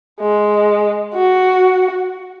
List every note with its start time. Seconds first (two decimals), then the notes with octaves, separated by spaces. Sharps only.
0.20 G#3
1.14 F#4